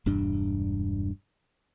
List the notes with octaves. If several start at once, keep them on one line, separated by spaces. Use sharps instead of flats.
E1 G2 D4